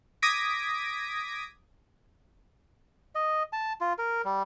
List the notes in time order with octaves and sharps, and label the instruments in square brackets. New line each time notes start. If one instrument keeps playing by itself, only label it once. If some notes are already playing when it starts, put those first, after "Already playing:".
[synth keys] D6 D#6 G#6 A#6 B6 D7
[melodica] D#5
A5
F4
A#4
G3